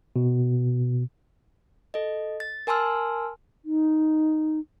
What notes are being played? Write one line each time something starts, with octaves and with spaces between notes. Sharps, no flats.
B2
A4 D#5
A6
A#4 G#5 A5 C6 E6 F6
D#4